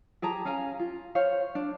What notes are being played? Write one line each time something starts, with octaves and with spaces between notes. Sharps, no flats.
G4 G#4 A5 A#5
C#4 F5 G#5 A#5
F4
C5 C#5 F5
D4